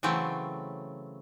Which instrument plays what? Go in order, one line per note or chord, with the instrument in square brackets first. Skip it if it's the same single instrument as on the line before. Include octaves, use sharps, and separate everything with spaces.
[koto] C#3 E3 F#3 A3 C4